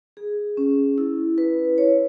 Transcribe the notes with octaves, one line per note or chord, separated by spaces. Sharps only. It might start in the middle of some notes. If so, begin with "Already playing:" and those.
G#4
C#4
E4
B4
C#5